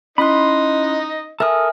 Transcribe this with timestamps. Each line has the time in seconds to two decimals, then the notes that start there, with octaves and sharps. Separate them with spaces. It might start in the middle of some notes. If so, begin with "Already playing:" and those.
0.18 C#4 D#4 E4 D#5 B5 C6 F#6
1.40 A4 A#4 E5 G#5 D#6 F6